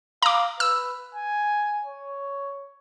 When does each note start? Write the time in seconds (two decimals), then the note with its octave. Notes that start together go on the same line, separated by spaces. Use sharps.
0.22 F5 A#5 D6
0.60 B4 E6
1.15 G#5
1.85 C#5